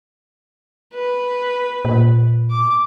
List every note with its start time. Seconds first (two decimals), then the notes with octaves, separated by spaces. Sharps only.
0.94 B4
1.85 A#2
2.50 D6